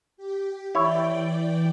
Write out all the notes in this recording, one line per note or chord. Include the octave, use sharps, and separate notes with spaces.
G4
E3 E4 C#5 D5 G5